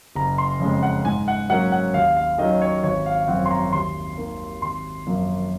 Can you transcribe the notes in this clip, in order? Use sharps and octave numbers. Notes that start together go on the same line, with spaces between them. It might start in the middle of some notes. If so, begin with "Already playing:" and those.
F#1 A#5
C6
F2 C#3 G#3
F#5
G#2 G#5
F#5
F#3 A#3 C#4 F#5
F#5
D#2 F5
F5
D#3 F#3 C#4 D#5
C#5
G#1 C#5
F5
F#2 F3 C4 F#5
C6
A#5
D#2 C6
D#3 A#3
G#1 C6
F#2 F3 A#3 C#4